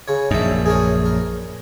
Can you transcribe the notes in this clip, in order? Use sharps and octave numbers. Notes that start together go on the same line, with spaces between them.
C#3 C#5
A#1 F#2 D#4 E5
G#4 A#4 C#5
A#4